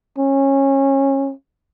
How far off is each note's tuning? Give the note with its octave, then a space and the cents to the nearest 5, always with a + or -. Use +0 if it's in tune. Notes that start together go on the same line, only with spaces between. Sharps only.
C#4 -20